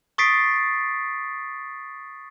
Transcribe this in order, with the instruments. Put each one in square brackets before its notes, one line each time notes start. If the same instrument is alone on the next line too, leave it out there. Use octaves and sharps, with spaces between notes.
[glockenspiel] C#6 D#6 A6 B6 C7 D7